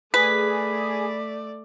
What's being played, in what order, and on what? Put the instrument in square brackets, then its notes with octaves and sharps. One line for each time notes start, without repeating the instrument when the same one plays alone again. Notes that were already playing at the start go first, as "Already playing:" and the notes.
[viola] A3 D5 [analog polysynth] G#4 [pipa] B4 [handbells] B6